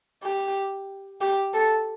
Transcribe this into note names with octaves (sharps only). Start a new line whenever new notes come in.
G4
G4
A4